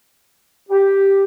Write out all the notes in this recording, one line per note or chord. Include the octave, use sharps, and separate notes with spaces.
G4